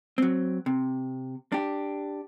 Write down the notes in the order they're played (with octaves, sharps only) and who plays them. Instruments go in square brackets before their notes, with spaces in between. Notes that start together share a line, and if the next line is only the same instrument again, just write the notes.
[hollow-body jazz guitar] F#3 C4
C3
D4 G4